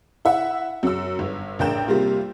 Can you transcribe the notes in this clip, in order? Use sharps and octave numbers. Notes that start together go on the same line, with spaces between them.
E4 E5 F#5
F#2 E6
G1
A1 D4 A#4 G5 G6 E7
C3 G3 A#3 F4